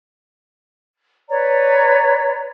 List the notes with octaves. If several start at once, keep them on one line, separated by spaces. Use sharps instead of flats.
B4 C#5 D5 A#5